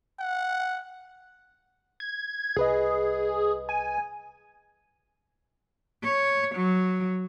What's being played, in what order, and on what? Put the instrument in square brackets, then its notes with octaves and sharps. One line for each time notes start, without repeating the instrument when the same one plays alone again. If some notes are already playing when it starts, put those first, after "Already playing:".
[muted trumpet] F#5
[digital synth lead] G#6
[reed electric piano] C2 B4 D#5 [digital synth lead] G#4
[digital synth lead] G#5
[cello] C#5
F#3